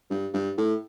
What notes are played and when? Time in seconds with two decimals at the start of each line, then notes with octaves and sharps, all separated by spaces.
0.11 G2
0.34 G2
0.58 A2